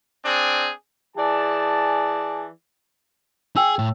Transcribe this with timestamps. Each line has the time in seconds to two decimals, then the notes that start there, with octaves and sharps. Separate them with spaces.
0.24 C4 D4 G#4
1.17 E3 G#4 D5 A5
3.57 G#4 G5 E6
3.79 A2